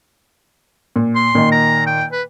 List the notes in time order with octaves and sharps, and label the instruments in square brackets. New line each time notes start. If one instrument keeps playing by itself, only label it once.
[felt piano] A#2
[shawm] C6
[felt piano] A#2 D#3
[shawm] A#5
G5
B4